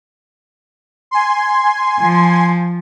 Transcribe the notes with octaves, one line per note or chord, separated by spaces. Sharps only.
G#5 C6
F3